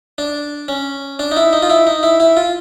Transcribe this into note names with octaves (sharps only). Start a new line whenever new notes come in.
D4
C#4
D4
D#4
E4
D#4
F4
E4
D#4
E4
E4
F4